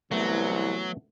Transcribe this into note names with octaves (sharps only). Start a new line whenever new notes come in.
C2 E3 F#3 A3 B3